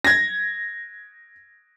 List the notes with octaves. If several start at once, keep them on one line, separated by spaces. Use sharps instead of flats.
G#6 A#6